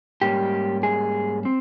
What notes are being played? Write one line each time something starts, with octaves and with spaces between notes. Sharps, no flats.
G#2 G3 A#3 C#4 G4
G#4
C4